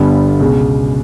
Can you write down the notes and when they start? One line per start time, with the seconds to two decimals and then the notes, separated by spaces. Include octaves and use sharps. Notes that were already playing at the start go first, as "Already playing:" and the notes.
Already playing: G1 G2 D3 G3 B3
0.40 C#2 B2 G#3